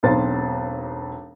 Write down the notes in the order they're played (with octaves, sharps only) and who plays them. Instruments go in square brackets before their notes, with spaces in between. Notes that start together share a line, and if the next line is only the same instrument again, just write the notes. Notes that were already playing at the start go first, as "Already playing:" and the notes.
[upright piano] E1 B1 C4 C5 A6